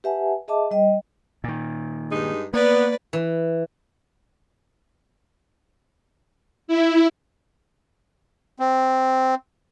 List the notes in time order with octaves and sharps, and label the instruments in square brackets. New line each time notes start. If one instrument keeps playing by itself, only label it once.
[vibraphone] G4 B4 E5 F#5 G#5 A5
G#4 D#5 E5 A5 D6
G3 D#5 G5
[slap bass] A#2 D#3
[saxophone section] G2 G#3 D#4
[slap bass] A#3 [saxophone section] B3 [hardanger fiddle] B4 D5
[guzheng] E3
[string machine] E4
[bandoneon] C4